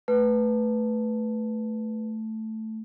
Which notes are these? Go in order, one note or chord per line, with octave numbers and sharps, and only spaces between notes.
A3 B4